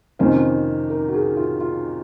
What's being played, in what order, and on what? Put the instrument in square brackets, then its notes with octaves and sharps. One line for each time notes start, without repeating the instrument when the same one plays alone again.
[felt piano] F2 C3 D#3 A#3 C#4 C5
A#4
F#4
G#4
F4
F4